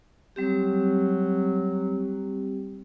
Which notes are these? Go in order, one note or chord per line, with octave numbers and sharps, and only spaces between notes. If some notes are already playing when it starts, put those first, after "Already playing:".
F#3 G3 C4 G4